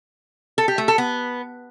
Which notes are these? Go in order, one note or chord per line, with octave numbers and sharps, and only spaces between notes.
A4
G4
A3
A4
B3